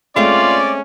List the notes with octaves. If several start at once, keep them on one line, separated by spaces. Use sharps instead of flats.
G#3 A3 C4 C#4 F4 D5